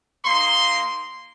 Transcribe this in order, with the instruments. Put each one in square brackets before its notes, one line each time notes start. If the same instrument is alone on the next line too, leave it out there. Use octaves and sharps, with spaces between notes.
[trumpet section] A#3 D#4 C6